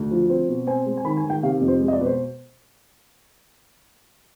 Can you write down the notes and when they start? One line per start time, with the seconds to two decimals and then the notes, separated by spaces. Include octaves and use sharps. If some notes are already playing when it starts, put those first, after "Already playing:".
Already playing: D2
0.11 F3
0.30 C4
0.48 B2
0.67 C4 G#5
0.86 G#3
0.97 G#5
1.04 D#3 B5
1.17 G#5
1.24 D#3
1.30 G5
1.43 C3 F5
1.61 F2
1.68 C5
1.80 G#3
1.88 D#5
1.93 D5
1.99 B2 B4
2.06 C5